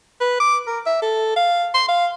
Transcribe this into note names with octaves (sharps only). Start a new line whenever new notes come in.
B4
D6
A#4
E5
A4
F5
C6
F5